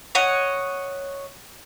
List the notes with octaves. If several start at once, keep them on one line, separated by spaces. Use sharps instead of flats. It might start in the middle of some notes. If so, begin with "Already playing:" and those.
C#5 D#5 F#5